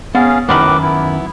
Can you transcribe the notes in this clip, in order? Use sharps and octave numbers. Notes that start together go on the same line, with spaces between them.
B3 C#4 G#4 F5
F#2 A2 D#3 B4 B5 D6
B3 E4